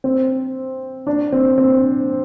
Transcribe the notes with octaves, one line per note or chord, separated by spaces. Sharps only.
C4
D4
C4
C4